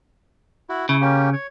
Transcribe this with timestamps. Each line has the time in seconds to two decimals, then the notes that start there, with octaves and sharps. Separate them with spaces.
0.69 E4 F#4
0.89 C#3 E4
1.01 A#3 C#4 G4
1.33 C#5